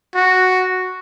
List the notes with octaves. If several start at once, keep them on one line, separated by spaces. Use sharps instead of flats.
F#4